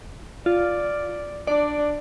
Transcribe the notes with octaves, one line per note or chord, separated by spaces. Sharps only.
F4 D5
D4 D5